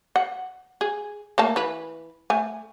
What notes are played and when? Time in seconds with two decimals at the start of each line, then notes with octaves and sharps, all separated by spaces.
0.16 F#5
0.81 G#4
1.38 A3 A#3 A5
1.56 E3 B4
2.30 A3 G#5